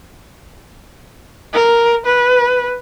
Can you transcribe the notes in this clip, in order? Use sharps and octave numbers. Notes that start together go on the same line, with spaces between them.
A#4
B4